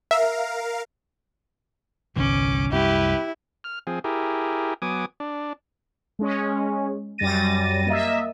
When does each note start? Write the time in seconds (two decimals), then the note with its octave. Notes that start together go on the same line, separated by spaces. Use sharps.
0.11 A#4 E5 F5
2.16 G1 C2 E3 C#4 D6
2.72 C2 F#2 E4 G4 B4
3.64 F6
3.87 F3 C4 G#4
4.04 E4 G4 G#4 A#4
4.82 F#3 B3 G#5 D6 D#6
5.20 D4
6.19 G#3 C#4
7.18 F#2 G3 A6 A#6 D#7
7.87 A#3 D#5 E5